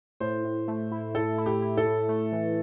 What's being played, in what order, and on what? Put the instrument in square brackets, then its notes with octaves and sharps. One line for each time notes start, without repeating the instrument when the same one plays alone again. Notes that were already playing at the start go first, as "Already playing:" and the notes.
[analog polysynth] A2 [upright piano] C5
[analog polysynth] A2
A3
E4
[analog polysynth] A2 [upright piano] A4
[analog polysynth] E4
[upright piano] G4
[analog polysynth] E4
[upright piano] A4
[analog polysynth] A2
A3
E3